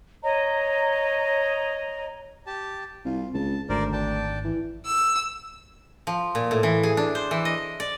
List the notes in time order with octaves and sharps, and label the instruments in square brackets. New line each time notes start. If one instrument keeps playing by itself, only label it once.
[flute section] C#5 D#5 A#5
[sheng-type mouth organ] G4 A5
[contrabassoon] C2 [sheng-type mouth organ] F4
[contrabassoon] C#2 [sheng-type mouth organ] A5
[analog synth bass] G#1 [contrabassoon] D2 [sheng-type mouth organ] A#4 C5 D5
[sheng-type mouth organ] D4 G5 A5
[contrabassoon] E3
[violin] E6
[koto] F3
A#2
A2
E3
G#4
D4
C5
E3
D#5
D5